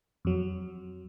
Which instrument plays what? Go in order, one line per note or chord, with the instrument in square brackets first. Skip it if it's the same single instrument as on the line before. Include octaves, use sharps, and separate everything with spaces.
[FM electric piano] F2 F#3